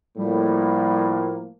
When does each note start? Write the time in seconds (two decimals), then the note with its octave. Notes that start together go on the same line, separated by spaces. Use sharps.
0.18 A2 F3 G3 A#3